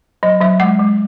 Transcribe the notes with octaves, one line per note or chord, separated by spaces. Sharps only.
F#3 D#5
F#3 E5
G#3 F#5
G#3